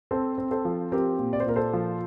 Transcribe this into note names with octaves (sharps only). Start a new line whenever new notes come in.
C4 A4 C5
C4
A4 C5
F3
C4 G4 A#4
A#2
D5
C5
A#2 A#4
A4 C5
F3